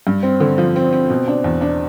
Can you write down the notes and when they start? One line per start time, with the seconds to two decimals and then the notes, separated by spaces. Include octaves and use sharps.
0.07 G2
0.23 C4
0.40 D3
0.58 F3
0.76 C4
0.93 C4
1.10 B2
1.28 D4
1.44 E2
1.61 D4